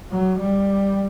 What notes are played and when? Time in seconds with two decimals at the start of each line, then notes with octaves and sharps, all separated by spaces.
0.12 F#3
0.39 G3